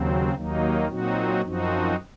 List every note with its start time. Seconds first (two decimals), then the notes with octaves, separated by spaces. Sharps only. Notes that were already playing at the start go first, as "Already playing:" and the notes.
Already playing: D#2 C#3 F#3 C4
0.34 D#2 D#3 F#3 A#3 D#4
0.88 A#2 F#3 C4 D#4 F#4
1.42 F#2 F3 C4 D#4 F#4